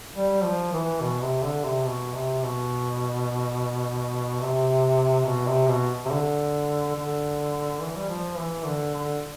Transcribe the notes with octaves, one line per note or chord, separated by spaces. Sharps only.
G3
F3
E3
B2
C3
D3
C3
B2
C3
B2
C3
B2
C3
B2
C3
D3
D3
E3
G3
F3
E3
D3
D3